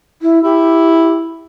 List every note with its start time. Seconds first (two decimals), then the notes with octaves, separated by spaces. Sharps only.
0.22 E4
0.44 E4 G4